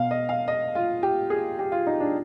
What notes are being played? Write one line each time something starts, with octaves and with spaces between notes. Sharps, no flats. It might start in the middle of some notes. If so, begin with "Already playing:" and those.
Already playing: B2 F5
D#5
F5
D#5
F4
G4
G#4
G4
F4
D#4
D4